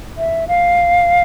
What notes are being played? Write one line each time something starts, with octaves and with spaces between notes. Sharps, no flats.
E5
F5